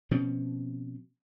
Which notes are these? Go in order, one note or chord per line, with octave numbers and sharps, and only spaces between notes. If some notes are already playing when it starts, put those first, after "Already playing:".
B2 F3 C4 C#4